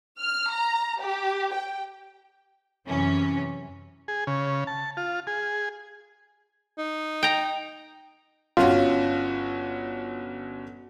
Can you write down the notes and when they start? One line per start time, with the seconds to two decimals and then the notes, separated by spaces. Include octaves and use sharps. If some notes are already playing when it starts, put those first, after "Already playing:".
0.20 F6
0.51 A#5
1.01 G4
1.54 G5
2.88 F#2 C3 E3 C#4
4.08 G#4
4.27 C#3
4.67 A5
4.97 F4
5.27 G#4
6.78 D#4
7.23 G5 A#5
8.57 G1 C#4 F4 F#4